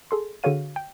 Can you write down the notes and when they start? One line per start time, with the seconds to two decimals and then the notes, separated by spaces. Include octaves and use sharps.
0.11 G#4 A4 C6
0.43 D3 F#4 G#4 C#5 F5 D#7
0.76 G5